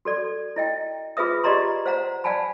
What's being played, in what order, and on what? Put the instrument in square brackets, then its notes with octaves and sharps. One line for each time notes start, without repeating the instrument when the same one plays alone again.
[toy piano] F#4 A4 D5
E4 D#5 G5
F4 G#4 B4 E5 D#6
F4 G4 D5 D#5 A#5 C6
C5 F5 F#5 A#5
D5 F5 F#5 G#5 A5 B5